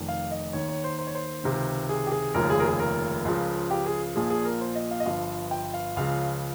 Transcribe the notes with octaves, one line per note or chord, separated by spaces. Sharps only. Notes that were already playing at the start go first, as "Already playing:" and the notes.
Already playing: F1 F2 D#3
F5
D#5
D#2 D#3 C#5
C#5
C5
C5
C#5
C5
C#2 C3 D#3
G#4
G4
G#4
F1 D#2 C#3 F3 A#4
G#4
A#4
G#4
A#4
C#2 C#3 F3
G4
G#4
A#1 A#2 F3 G#4
G#4
A#4
C5
D#5
F5
D#5
G1 G2 F3 F5
G5
F5
C#2 C#3 F3 F5